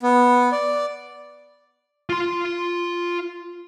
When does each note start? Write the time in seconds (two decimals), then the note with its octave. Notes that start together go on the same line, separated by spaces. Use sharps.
0.03 B3
0.52 D5
2.09 F4 C6